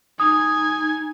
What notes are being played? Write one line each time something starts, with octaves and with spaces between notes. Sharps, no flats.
D#4 G#5 D#6